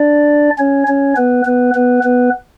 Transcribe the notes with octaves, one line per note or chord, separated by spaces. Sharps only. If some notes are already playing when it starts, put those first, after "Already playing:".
Already playing: D4 D5
C#4 C#5
C#4 C#5
B3 B4
B3 B4
B3 B4
B3 B4